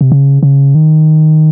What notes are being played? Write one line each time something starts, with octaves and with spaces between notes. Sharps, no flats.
C3
C#3
C#3
D#3